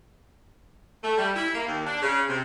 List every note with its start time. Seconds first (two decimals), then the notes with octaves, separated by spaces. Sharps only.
1.04 A3
1.18 G3
1.36 E4
1.55 A#3
1.67 D#2
1.87 D4
2.02 C#3
2.29 C3